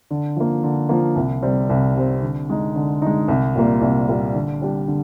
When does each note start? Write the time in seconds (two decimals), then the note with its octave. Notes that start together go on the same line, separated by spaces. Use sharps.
0.11 D3
0.36 F3 A#3
0.64 D3
0.89 F3 A#3
1.16 C2
1.42 C3 G3 C4
1.69 C2
1.96 C3 G3 C4
2.22 D3
2.50 G#3 D#4
2.76 D3
3.02 G#3 D#4
3.28 C2
3.55 A#2 G3 A#3
3.81 C2
4.09 A#2 G3 A#3
4.35 D3
4.61 G3 D4 G4
4.88 D3